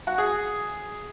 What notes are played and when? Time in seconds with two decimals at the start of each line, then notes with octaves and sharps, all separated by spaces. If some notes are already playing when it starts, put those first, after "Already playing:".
0.07 F#4
0.18 G#4